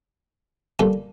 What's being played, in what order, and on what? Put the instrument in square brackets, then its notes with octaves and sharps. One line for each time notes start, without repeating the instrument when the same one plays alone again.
[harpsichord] A#2 G3 A4